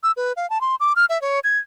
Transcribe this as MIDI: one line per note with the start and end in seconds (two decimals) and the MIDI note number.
0.03 0.12 88
0.17 0.33 71
0.37 0.49 77
0.50 0.61 81
0.61 0.75 84
0.80 0.93 86
0.96 1.05 89
1.10 1.20 76
1.22 1.40 73
1.44 1.58 92